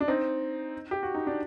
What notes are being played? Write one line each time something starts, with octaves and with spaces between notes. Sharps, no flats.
D4
C4 D#4
G4
F#4
D#4
D4